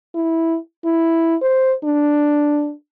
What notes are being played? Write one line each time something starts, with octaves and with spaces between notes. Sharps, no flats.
E4
E4
C5
D4